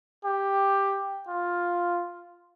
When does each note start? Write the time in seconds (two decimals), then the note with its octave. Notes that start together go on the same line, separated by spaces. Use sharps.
0.24 G4
1.28 F4